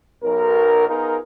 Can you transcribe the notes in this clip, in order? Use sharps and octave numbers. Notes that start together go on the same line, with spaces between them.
B1 A#4
B3 D#4 F4 G#4 A#4